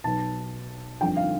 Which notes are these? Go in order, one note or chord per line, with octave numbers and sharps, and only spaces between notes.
B1 B2 A5
G1 F2 D3 G5
F5